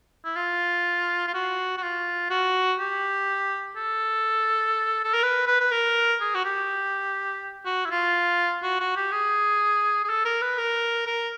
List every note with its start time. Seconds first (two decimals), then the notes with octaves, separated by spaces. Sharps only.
0.25 E4
0.36 F4
1.27 F4
1.34 F#4
1.78 F#4
1.82 F4
2.30 F#4
2.79 G4
3.76 A4
5.04 A4
5.14 A#4
5.23 B4
5.47 B4
5.60 B4
5.71 A#4
6.21 G#4
6.35 F#4
6.45 G4
7.66 F#4
7.85 E4
7.91 F4
8.63 F#4
8.80 F#4
8.96 G4
9.12 G#4
10.04 G#4
10.09 A4
10.25 A#4
10.42 B4
10.58 A#4
11.07 A#4